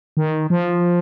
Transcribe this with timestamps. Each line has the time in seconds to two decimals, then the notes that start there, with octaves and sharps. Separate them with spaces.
0.17 D#3
0.50 F3